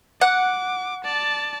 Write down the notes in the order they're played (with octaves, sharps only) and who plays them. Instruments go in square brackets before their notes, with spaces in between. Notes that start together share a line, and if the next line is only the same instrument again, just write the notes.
[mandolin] F#5 [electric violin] D6
[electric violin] D5 A5